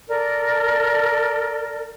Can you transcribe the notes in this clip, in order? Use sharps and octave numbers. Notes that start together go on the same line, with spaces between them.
A4 A#4 D5